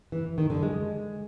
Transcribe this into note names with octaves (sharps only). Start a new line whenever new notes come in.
E3
D#3
D3
G#3